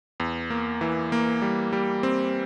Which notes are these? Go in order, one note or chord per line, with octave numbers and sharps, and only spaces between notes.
E2
A#3
E3
A#3
G3
G3
C4